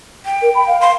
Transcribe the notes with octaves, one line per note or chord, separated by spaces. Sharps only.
G5
A#4
B5
F5
C6